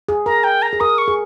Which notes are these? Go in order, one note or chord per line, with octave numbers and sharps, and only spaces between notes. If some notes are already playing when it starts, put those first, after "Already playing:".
G#4
A#4 A#5
G5
A#5
G#4
A#4 D#6
C#6
G#4